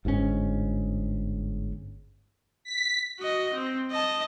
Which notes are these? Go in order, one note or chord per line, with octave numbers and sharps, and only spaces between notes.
G1 G#2 B2 C#4
B6
F#4 D#5
C4
D#5 A5